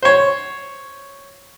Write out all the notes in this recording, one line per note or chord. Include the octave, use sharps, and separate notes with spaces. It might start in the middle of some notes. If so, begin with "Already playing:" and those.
C5 C#5